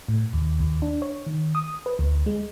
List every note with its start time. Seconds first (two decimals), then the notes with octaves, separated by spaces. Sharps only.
0.08 A2
0.33 D#2
0.60 D#2
0.82 D4
1.02 C#5
1.26 D#3
1.55 D#6
1.86 B4
1.99 D2
2.26 G#3